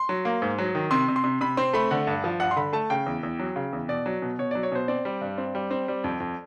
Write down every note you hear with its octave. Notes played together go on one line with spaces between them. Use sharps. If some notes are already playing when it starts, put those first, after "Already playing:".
Already playing: C6
F#3
A#3
G#2
F#3
D#3
C3 C6
C3
C6
C3
C3 B5
C4 C6
A3 B5
D3 F#5
G2
F3
G2 F#5
C6
D3 B5
A3 A5
C#3 G5
E2
E2
F#3
C#3
E2
B2 D5
F#3
B2
B2 C#5
F#3 D5
C#5
B2 C5
C4 D5
G3
G2
C4
G3
C4
G3
F2
F2